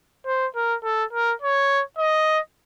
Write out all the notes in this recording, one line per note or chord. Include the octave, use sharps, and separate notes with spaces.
C5
A#4
A4
A#4
C#5
D#5